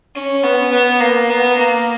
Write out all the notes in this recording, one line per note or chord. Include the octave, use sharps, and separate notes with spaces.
C#4
B3
B3
A#3
B3
A#3